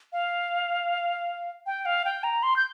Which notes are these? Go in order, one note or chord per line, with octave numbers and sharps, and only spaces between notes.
F5
G5
F5
G5
A#5
C6
G6